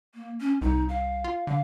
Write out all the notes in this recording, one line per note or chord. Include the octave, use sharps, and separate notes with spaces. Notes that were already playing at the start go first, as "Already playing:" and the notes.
A#3
C#4
C2 D#4
F5
F4
D3 F5